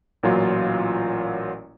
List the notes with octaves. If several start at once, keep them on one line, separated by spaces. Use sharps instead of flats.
A1 A#2 F#3 F4